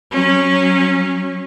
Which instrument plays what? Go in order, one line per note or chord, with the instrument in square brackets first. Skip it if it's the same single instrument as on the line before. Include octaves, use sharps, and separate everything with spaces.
[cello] F#3 C#4